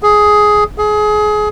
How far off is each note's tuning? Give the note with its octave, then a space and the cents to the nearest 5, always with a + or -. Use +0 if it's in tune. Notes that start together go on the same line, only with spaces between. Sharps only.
G#4 +10
G#4 +25